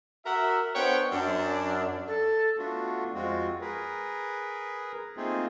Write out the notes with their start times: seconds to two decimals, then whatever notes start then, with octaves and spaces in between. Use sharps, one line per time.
0.24 F#4 A#4 E5
0.74 B3 D4 C5 C#5 F#5 G5
1.11 F#2 D4
2.07 A4
2.57 A3 B3 D4 F4 F#4
3.14 F2 G#3 C4 F4 F#4
3.61 G#4 A#4 B4
5.17 A3 A#3 C4 D#4 F4 G#4